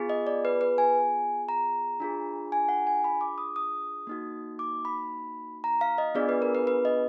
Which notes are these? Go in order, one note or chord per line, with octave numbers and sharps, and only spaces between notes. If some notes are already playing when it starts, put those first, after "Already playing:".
Already playing: B3 F4 G#4
D#5
D5
B4
B4
G#5
A#5
D4 F4 G#4
G#5
F#5
G#5
B5
D6
D#6
D#6
A#3 D#4 F#4
D6
B5
A#5
F5
D#5
B3 D4 F4 G#4 D5
B4
A#4
B4
B4
D#5